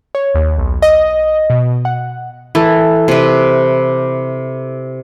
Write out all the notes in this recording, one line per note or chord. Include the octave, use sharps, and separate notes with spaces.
C#5
D#2
B1
D#5
B2
F#5
E3 A4
C3 B4